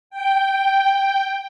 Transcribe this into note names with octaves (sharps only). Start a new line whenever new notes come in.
G5